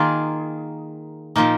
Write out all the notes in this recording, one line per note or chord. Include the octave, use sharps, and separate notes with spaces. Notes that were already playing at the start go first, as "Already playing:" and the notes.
Already playing: D#3 A#3 F4 G#4
A#2 F3 A#3 D#4